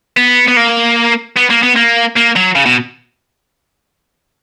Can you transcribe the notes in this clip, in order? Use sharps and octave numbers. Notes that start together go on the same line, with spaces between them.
B3
B3
A#3
B3
A#3
B3
A#3
A#3
F#3
C#3
B2